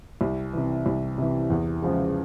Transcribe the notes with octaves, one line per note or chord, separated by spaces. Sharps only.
C2
C3 E3
C2
C3 E3
E2
C#3 F3 G#3